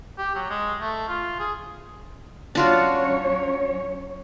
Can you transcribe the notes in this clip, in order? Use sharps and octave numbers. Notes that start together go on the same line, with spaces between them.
G4
F#3
G#3
A3
F4
G#4
F#3 C#4 D4 F4 F#4 C#5